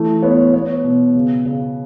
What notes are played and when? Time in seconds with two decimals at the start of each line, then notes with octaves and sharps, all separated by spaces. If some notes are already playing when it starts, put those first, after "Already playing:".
Already playing: E3 A3
0.22 B3 C#5
0.53 B3 C#5
0.84 B2
1.15 C#3
1.45 C#3